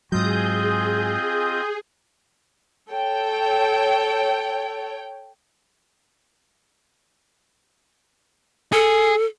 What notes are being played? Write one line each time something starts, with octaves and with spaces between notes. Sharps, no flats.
G#2 F#3 C4 F4 G#4 D#5 D#6 G6
A4 C#5 G5
G#4 A4